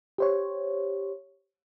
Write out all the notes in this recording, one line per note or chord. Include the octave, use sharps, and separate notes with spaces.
G4 C5 C#5